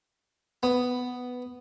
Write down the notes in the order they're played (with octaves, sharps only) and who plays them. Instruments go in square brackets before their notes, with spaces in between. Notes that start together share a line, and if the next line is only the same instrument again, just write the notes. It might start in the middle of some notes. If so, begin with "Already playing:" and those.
[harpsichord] B3